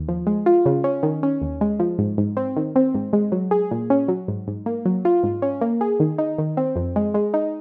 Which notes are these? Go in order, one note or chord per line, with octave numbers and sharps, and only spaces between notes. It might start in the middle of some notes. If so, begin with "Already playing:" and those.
Already playing: D#2
F3
G#3
F4
C#3
C#4
D#3
C#4
D#2
G#3
F3
G#2
G#2
C4
D#3
C4
G#2
G#3
F#3
G#4
A#2
C#4
F#3
G#2
G#2
A#3
F#3
F4
G#2
C#4
A#3
G#4
D#3
D#4
D#3
C4
F2
G#3
G#3
D#4